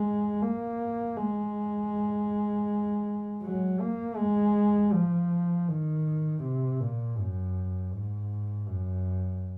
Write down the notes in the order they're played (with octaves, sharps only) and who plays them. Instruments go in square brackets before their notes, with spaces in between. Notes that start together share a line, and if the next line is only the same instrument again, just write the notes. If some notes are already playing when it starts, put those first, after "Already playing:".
Already playing: [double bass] G#3
A#3
G#3
F#3
A#3
G#3
F3
D#3
C3
A#2
F#2
G#2
F#2